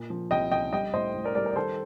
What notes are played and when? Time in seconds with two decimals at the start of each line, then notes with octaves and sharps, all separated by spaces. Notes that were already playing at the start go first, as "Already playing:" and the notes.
Already playing: A#2
0.10 F3
0.31 C2 D#5 G5
0.51 C2 D#5 G5
0.72 G3 D#5 G5
0.94 A2 C5 D#5
1.15 A2
1.24 A#4 D5
1.35 G3 A#4 D5
1.46 A#4
1.51 D5
1.56 D#3 A4 C5